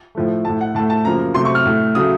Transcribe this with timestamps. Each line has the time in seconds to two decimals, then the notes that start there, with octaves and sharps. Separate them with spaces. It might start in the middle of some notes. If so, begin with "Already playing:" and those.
0.15 A2 F3 A3
0.45 A2 A3 A5
0.61 F#5
0.75 A2 A5
0.79 A3
0.90 A5
1.05 F#2 C#3 F3 A#3 A#5
1.34 C3 F#3 A3 C6
1.45 C#6
1.55 F6
1.65 A2 A3
1.95 C#3 F#3 A3 D#6